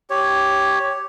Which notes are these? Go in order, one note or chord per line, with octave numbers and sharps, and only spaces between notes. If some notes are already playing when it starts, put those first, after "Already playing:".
G4 C#5